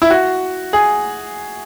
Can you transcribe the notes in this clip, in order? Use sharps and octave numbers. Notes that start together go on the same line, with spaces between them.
E4
F#4
G#4